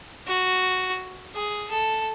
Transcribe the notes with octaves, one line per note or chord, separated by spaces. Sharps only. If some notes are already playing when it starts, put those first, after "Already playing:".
F#4
G#4
A4